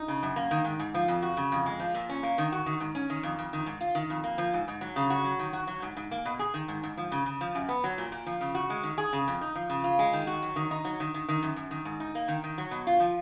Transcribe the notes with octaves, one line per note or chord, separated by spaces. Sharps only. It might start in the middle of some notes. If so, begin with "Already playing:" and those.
Already playing: D#4
C#3
F#2
A#3
D#3
G#2
G#2
F3
F2
F#4
C#3
F2
G#3
F3
A#2
C#4
A#3
D#3
F#4
D#3
G#2
C#4
D#3
F2
F2
D#3
G#2
F4
D#3
F2
A#3
F3
G#2
G#2
F#3
C#3
F#4
F#3
D#3
F#4
F#3
G#2
G#2
A#3
B2
G#4
D#3
G#2
G#2
F3
C#3
C#3
F3
F#2
B3
F#3
A#2
A#2
F3
C#3
F#4
G#3
D#3
G#4
C#3
F2
D#4
F3
C#3
F4
G#3
D#3
F#4
F#3
D#3
D#4
F#3
D#3
D#3
D#3
F#2
F#2
D#3
G#2
D#4
A#3
D#3
D#3
F#3
B2
F4
F3